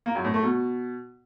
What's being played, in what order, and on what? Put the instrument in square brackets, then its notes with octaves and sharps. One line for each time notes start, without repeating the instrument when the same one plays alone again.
[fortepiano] A#3
F#2
A2
A3
B2